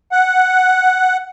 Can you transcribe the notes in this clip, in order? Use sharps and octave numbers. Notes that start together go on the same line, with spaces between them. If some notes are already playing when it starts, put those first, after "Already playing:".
F#5